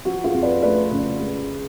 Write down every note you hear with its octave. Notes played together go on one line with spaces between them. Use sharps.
F3 F#4
F4 G#4
F2
B4 D5
A3 B4 D5
C#3
G#3